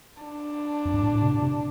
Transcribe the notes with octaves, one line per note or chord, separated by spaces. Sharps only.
D4
F2
G2
A2
A2
C3
C3